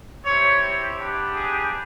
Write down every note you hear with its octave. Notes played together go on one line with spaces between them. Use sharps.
C4 E4 G4 C#5
B3 D4 G4
G#4